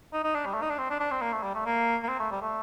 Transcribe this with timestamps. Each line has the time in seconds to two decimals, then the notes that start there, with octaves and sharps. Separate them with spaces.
0.13 D#4
0.24 D#4
0.35 D4
0.46 G3
0.54 A3
0.62 D#4
0.70 D4
0.78 C4
0.90 D4
1.00 D4
1.11 C4
1.22 A#3
1.33 A3
1.43 G3
1.55 A3
1.66 A#3
2.03 A#3
2.08 C4
2.19 A3
2.31 G3
2.42 A3